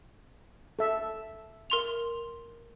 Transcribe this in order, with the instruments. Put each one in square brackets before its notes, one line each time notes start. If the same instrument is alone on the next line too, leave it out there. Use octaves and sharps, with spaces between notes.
[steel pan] A4 E5
[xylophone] A#4 C6 F7